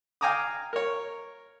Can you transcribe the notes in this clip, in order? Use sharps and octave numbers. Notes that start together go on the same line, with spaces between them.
F5 G5 G#5 A#5 D6 D#6
A#4 C#5